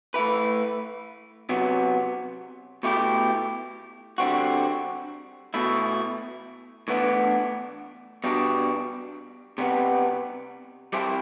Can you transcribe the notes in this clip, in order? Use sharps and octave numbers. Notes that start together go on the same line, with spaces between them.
A3 E4 B4
C3 F#3 B3
B2 A3 E4 G4
D3 G3 C4 F#4
B2 A3 E4
A2 E3 B3 D4
B2 G3 D4
C3 G3 B3
G3 C4 E4 G4 C5